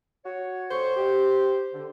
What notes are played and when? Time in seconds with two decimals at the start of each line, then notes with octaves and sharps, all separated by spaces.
0.25 F#4 C#5
0.71 F2 C5 C#6
0.97 G4
1.74 D3